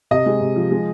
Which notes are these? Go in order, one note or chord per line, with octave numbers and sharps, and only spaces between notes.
C3 D#5
G#3
C3
F3
G#3